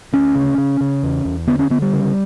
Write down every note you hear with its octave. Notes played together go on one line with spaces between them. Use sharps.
D2 C#4
C#3
C#3
C#3
E2
E2
D3 B3
C#4
D3 B3
G3
C#3